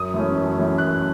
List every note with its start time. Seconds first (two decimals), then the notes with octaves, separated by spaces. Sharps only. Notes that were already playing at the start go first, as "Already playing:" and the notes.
Already playing: F#2 D#6
0.14 E3 A3 C#4
0.36 F#2
0.58 E3 A3 C#4
0.78 F#2 F#6